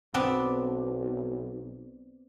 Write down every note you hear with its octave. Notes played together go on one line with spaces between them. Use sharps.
B1 B3 C4 D4